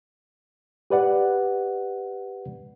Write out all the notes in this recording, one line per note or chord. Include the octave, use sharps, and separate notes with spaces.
G4 B4 D5 F#5